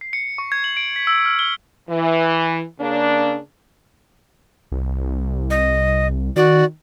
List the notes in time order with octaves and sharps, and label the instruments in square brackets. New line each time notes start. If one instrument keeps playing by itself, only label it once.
[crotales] C7
C#7
C#6
G#6
F#7
D7
B6
E6
F6
G7
[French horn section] E3
C#3 A#3 D4
[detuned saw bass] C2
[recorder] D#5
[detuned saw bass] D#3 [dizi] F#4 [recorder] D5